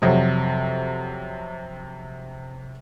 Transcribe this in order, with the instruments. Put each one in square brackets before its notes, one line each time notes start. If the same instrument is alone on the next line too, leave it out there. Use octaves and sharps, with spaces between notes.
[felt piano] F2 C3 F#3